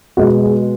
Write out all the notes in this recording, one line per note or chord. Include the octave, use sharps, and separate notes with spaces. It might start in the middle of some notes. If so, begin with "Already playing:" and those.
B2 G#3 F#4
G#4